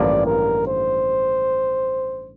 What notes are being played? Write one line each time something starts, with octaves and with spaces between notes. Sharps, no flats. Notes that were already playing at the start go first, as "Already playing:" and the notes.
Already playing: A1 G2 D3 F3 A#3 D5
A#4
C5